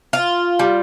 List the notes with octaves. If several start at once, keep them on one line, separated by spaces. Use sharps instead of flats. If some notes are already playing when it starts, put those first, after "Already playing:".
F4
G3